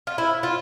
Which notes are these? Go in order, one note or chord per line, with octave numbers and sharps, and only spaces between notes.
F4
E4
F4